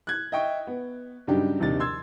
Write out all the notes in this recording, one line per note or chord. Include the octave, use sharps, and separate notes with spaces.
F#6 G#6
D#5 E5 G5 C#6
B3
G2 C#3 F#3 D4 D#4 G4
A#1 D#2 C3 D#4 A6
C6 E6 G#6